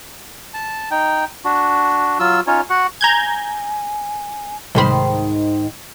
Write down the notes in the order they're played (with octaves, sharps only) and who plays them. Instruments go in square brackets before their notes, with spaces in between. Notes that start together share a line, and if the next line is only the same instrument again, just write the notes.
[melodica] A5
D#4 G5
D4 F#4
F#3 F4 E6
C#4 D#4 F4 C#5
F#4 F#5
[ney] G#5 [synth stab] A#5 G6 G#6
[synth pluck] C2 B5 [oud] G#2 D#3 C5